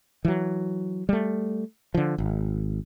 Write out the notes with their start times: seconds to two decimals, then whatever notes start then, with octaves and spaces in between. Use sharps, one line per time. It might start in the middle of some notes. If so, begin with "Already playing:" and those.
0.25 E3 F#3
1.09 G3 A3
1.94 D3 F3
2.18 G#1